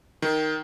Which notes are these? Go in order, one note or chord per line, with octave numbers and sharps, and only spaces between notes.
D#3